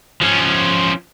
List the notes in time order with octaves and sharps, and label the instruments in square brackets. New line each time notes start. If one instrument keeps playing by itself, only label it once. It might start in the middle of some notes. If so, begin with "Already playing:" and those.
[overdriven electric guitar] F3 C#4